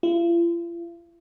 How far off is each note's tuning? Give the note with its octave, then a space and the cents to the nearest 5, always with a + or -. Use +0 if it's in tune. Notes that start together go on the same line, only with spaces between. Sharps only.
F4 -45